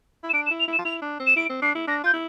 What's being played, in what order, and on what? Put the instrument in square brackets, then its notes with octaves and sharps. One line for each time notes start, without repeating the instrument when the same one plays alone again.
[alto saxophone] E4
[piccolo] E7
[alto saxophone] D4 [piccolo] D7
[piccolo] E7
[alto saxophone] E4
[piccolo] F7
[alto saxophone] E4 [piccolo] E7
[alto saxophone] F4
[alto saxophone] E4 [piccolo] F7
[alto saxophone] D4
C4
[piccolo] E7
[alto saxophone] E4 [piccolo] D7
[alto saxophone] C4
[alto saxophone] D4 [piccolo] C7
[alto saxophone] E4
[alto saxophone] D4 [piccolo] A#6
[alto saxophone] F4 [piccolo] G6
[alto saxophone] E4